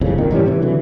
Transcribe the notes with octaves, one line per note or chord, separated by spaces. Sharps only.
F#1 C2 F2 C#3
F#1 A#2 D#3
G#2 E3 G3 C#4
C3 E3
D3 E3 F#3